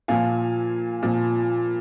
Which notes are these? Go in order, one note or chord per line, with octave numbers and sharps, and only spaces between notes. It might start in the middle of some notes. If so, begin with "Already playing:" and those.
A#2 F3 F5 G#5
A#2 F3